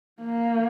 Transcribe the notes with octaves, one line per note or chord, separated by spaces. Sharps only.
A#3